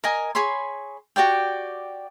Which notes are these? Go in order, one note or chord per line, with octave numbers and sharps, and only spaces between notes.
A#4 D#5 G#5
G#4 C#5 B5 C6
F#4 G4 D5 G5